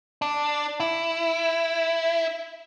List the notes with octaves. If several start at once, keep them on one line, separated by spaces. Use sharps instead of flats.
D4
E4